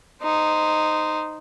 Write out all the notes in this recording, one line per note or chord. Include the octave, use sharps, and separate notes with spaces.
D#4 C5